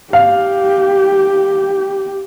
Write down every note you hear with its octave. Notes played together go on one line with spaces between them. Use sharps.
G4 F5